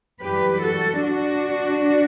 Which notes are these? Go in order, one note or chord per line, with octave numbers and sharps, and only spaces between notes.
F#2 E3 G3 G4 B4
F#4 A4
D4 F#4